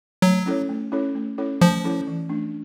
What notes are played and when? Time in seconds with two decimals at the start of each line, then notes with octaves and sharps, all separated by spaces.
0.22 F#3 A3
0.46 C#4 E4 A4 C#5
0.69 A3
0.92 C#4 E4 A4 C#5
1.15 A3
1.38 C#4 E4 A4 C#5
1.61 F3 A3
1.84 C#4 E4 A4 C#5
2.07 E3
2.29 A3 D4